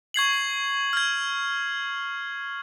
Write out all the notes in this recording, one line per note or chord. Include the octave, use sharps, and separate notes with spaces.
C#6 G#6 C7 F#7
F6 G#6